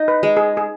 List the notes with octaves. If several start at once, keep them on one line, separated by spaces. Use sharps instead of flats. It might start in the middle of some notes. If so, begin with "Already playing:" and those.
Already playing: D#4
B4
G#3
G#4
G#4